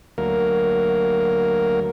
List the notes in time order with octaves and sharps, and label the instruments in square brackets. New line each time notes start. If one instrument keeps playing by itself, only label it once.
[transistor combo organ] D2 F#3 A#3 A#4